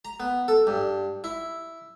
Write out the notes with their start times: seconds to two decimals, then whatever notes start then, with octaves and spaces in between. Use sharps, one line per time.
0.05 A#5
0.20 B3
0.48 A4
0.67 G2
1.24 E4